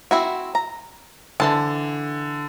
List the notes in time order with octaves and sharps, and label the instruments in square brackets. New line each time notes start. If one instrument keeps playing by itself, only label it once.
[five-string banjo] C4 E4 F#4
A#5
[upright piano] D3 [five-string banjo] E3 C5 A5